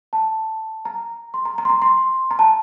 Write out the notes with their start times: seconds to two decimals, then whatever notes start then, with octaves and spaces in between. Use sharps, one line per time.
0.13 A5
0.85 A#5
1.34 C6
1.45 A#5
1.58 A#5
1.65 C6
1.70 A#5
1.82 C6
2.31 A#5
2.39 A5